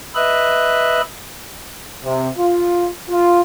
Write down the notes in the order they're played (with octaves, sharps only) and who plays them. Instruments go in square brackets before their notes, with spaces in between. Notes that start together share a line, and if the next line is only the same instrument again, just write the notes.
[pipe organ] B4 D#5 E5 F#6
[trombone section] C3
F4
F4